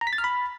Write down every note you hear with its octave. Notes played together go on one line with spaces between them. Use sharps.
A#5
B6
A6
F6
B5